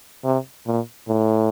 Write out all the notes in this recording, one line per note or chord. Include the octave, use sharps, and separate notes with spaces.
C3
A#2
A2